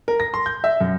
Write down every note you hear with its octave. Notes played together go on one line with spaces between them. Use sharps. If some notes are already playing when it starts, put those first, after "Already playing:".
A#4
A#6
C6
G6
E5
F#2